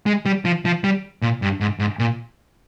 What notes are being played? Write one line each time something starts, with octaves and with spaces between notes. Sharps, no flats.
G#3
G3
F3
F3
G3
A#2
G2
G#2
G#2
A#2